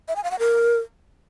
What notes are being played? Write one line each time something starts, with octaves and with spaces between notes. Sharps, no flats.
E5
G#5
F5
F#5
A#4